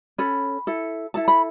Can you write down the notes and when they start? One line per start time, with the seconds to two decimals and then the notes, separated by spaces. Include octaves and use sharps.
0.18 C#4 A4 B5
0.67 E4 A4
1.14 E4 A4 A5
1.28 B5